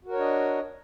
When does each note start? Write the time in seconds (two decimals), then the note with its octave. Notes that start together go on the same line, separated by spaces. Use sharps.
0.05 F#4
0.09 A#4
0.12 C#5
0.16 D4
0.20 D#5